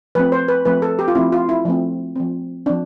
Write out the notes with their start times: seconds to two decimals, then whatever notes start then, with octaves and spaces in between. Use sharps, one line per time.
0.15 F3 A3 C4 B4
0.32 C5
0.48 B4
0.65 F3 A3 C4 B4
0.82 A4
0.99 G4
1.08 F4
1.15 F3 A3 C4 E4
1.33 F4
1.49 E4
1.65 F3 A3 C4
2.16 F3 C4
2.66 F3 C4 D4